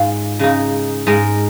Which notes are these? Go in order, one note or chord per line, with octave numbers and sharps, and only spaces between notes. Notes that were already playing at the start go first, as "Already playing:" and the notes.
Already playing: G#2 G#3 F4
C#3 G#3 D#4
G#2 G#3 D#4 A#4